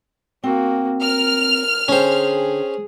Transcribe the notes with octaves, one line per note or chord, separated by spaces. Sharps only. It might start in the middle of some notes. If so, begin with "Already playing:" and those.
A#3 C4 F#4
A#4 F6
D3 C#4 G#4 C5 G5